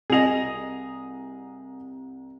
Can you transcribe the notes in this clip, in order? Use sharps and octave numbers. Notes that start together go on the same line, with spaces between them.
C2 G#4 D#5 F7